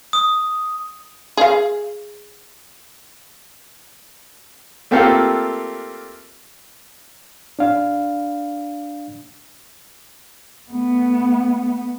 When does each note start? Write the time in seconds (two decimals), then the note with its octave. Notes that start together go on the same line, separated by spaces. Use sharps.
0.13 D#6
1.37 G#4 F5
4.91 A3 A#3 C4 F4 G4 A4
7.59 D4 F5
10.70 A3 B3